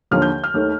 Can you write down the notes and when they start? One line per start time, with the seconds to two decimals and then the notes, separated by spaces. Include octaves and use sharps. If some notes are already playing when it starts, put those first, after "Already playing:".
0.11 D#2 D3 F3 A#3 F6
0.22 G6
0.44 F6
0.54 D#2 D#3 A3